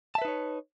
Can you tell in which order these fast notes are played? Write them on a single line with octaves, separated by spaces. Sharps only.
A5 E5 B4 D#4 C#5